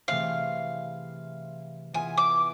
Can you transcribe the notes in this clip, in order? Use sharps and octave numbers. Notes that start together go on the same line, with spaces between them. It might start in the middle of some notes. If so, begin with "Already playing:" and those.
C3 E3 A3 C4 G#4 F5
E3 B3 F4 G#4 G#5
D6